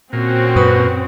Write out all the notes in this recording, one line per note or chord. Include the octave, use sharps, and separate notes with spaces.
A#2 C4 C#4 F#4
F#2 B4 C#6 D#6